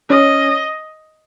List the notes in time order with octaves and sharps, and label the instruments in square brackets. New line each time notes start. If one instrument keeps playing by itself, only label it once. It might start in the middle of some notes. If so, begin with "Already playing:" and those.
[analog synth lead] C#4 [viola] D#5